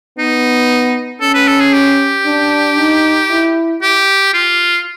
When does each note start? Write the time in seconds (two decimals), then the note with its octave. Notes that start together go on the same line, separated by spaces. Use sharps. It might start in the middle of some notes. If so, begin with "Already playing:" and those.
0.18 B3 D#4
1.21 C#4 A4
1.34 B4
1.48 A4
1.60 G#4
1.73 G4
2.26 D4
2.78 D#4
3.30 E4
3.82 G4
4.34 F4